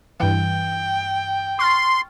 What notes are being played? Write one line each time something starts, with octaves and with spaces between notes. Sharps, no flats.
G2 E3 G5
C6 C#6 F6 A6